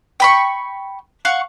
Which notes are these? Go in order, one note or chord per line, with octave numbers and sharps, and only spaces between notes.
G5 B5 C#6
F5 F#5 C#6